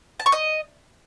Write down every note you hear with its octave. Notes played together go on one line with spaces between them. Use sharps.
A5
C#6
D#5